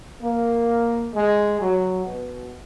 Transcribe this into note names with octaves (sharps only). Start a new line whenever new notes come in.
A#3
G#3
F#3
B2